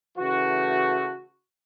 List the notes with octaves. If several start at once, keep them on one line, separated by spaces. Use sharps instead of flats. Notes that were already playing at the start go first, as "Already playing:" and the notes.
C#3 E3 A3 F#4